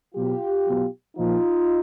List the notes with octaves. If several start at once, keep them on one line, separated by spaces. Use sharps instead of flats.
B2 F#3 F4 G4
B2 F#3
A#2 F3 D#4 F4